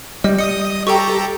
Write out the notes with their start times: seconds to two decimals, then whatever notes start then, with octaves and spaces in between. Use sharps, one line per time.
0.24 G3 D#5
0.39 D#5 D#6 C#7
0.87 G4 A4 G5 A#5 C#6